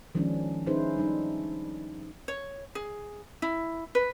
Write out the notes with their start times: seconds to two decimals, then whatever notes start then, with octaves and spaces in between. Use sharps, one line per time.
0.15 D#3 F3 G#3 C#4 D4
0.66 C#4 D#4 E4 G#4 B4 C5
0.96 G3 D4 D#4
2.28 C#5
2.75 G#4
3.42 E4
3.95 B4